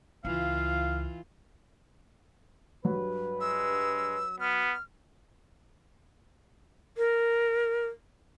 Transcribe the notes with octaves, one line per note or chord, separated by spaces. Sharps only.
C#2 E3 F4 F5
G2 F#3 B4
G#3 E6
B3 F6
A#4